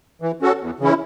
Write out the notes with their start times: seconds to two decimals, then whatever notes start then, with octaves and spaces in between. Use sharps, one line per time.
0.22 E3
0.41 C#4 F#4 A4
0.61 E2
0.80 C#3 E3 C#4 E4